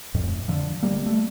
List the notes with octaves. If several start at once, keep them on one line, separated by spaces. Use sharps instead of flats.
F2 A2
D3 F3
G3 A#3
A3